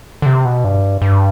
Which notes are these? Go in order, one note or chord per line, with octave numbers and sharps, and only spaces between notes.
D3
C3
B2
G2
G2